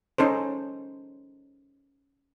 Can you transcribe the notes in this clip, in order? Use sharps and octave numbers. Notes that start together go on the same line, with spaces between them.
C#4 D#4 A4 C5